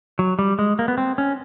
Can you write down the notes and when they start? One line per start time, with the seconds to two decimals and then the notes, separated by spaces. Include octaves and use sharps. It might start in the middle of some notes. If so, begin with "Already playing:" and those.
0.19 F#3
0.39 G3
0.59 G#3
0.79 A#3
0.88 B3
0.98 C4
1.18 C#4